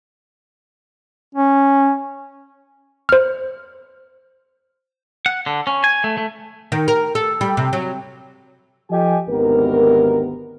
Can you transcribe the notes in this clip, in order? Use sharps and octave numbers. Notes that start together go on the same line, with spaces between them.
C#4
C5 F6
F#5
D3
C#4
G#5
A3
A3
D#3
A#4
A4
G3
C3
F#3
F3 G4 A4 D#5 G#5
G#1 D2 D#3 B3 G4 A#4